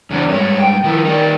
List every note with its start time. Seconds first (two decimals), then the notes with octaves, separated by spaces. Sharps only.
0.10 E2 C#3 D4 C5
0.29 G2 G#3 C#5 E5
0.59 A2 G5
0.84 D#3 F3 E4
1.05 D#4 G4 D5